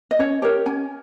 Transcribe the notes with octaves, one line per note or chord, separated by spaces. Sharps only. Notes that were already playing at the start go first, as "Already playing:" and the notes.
D#5
C#4 C#5
G4 A#4 C#5
C#4 G#5